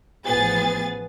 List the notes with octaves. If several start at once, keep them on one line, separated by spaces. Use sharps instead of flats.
A1 F3 B3 G#4 A6